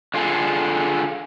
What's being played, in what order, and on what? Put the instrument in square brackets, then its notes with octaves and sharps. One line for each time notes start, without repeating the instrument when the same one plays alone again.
[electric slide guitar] D3 F4 G#4 A4